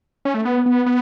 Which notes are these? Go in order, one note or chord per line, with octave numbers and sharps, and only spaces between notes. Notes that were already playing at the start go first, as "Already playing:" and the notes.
C#4
A3
B3
B3
B3